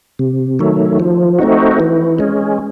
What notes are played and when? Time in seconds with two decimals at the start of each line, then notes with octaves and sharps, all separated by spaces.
0.19 C3
0.59 D#3 F#3 A3
1.00 F3
1.38 A3 C4 D#4 F#4
1.80 E3
2.19 G#3 C#4